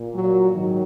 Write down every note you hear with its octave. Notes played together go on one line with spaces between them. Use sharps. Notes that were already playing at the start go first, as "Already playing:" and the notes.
Already playing: A#2
F#3
G#2 D#3 F#3